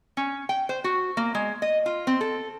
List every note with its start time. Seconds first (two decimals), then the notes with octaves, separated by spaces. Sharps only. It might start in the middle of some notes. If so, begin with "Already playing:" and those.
0.17 C#4
0.49 G5
0.69 C5
0.84 F#4
1.17 A#3
1.35 G#3
1.62 D#5
1.86 F4
2.07 C4
2.21 A4